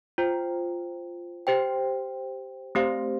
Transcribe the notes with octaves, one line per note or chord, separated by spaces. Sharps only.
F4 C5 G5
G4 C5 G5
A3 C4 G4 C5 F5